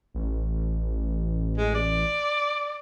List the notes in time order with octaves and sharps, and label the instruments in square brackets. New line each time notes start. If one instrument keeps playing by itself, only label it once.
[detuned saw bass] A1
[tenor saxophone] G#3
D5